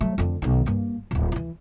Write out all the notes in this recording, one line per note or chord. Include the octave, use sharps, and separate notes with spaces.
F#3 A3
F2 D3
B1 D#3
G2 A#3
D1 F#2
E3 E4